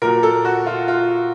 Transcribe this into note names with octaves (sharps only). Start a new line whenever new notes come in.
A#2 F#3 A#4
A4
F#4
F4
F4